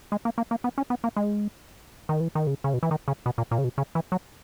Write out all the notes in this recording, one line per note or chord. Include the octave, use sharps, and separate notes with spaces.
G#3
A#3
A#3
A#3
B3
C#4
B3
A#3
G#3
D#3
E3
D#3
C#3
C#3
B2
E3
D#3
C#3
B2
A#2
A#2
C#3
B2
C#3
E3
F#3